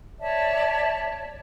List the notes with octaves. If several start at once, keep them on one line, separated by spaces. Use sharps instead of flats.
C#5 D5 E5 A5